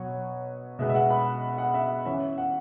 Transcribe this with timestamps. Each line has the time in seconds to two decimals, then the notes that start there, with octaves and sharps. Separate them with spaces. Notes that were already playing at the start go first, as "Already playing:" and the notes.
Already playing: B2 F#3 B3 C#5 F#5
0.79 B2 G#3 B3 E5
0.89 E5
0.95 F#5
1.11 B5
1.58 F#5
1.74 E5
2.05 E3 C#4 E5
2.38 F#5